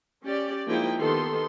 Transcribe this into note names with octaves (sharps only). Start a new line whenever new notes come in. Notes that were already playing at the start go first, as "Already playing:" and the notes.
C#4 G4 D5
F3 G#3 A#3 D#4 E4 G5
D#3 B3 G4 A4 C6